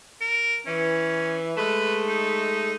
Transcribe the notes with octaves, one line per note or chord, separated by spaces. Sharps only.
A#4
E3 C#4
G#3 A3 B4
D#4